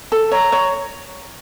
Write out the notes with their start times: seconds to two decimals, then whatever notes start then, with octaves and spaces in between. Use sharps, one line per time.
0.12 A4
0.32 C#5 A#5
0.52 C#5